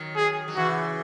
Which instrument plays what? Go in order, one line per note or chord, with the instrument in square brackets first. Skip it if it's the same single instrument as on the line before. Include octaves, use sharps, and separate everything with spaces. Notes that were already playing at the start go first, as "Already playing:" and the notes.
Already playing: [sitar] D#3 F#3
[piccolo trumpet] G#4
[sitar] F#3
[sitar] C#3 E3 [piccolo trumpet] F#4